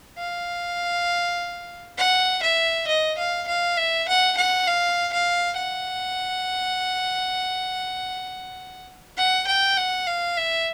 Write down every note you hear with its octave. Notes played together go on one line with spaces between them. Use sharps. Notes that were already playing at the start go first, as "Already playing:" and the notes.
F5
F#5
E5
D#5
F5
F5
E5
F#5
F#5
F5
F5
F#5
F#5
G5
F#5
F5
E5